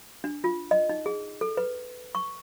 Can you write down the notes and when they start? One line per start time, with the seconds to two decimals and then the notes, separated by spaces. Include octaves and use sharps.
0.24 D4
0.44 F4
0.71 D#5
0.89 D#4
1.06 G#4
1.41 A4
1.57 B4
2.15 C#6